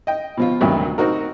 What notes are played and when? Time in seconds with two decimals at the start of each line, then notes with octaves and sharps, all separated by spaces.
0.07 D#5 G5
0.37 B2 F3 F4
0.61 D2 G2 C3 D#3 F#3
0.98 C4 D#4 F#4 A#4